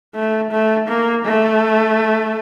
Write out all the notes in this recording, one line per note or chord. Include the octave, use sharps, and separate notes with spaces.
A3
A3
A#3
A3